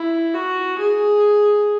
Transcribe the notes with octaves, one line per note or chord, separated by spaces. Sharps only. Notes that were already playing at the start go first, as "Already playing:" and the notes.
Already playing: E4
F#4
G#4